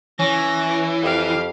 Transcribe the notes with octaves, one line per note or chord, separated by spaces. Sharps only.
E3 C#4 A#6
F2 G4 F5